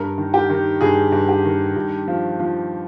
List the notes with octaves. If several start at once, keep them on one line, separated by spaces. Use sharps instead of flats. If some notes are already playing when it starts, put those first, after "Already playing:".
Already playing: G2 A#4
D#3
G4
D#3
G2 G#4
G2
G4
D#3
G2
F3
F3